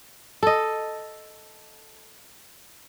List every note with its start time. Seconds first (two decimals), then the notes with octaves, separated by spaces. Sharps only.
0.43 A4 D#5